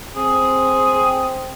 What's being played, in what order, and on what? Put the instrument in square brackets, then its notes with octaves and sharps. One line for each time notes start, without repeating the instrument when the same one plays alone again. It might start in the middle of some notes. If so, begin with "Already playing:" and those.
[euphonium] C4 [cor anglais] G#4